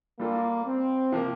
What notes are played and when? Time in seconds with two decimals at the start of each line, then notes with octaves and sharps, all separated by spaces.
0.19 G3 A#3 D4 F4 A4
0.66 C4
1.12 C3 F3 A#3